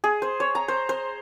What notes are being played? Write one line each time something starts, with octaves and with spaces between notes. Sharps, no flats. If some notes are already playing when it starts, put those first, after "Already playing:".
G#4
C5
C#5
A#5
C5
C5